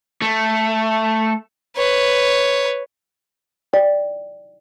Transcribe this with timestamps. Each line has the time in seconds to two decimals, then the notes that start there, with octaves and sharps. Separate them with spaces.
0.22 A3
1.77 B4 C#5
3.73 D5 G5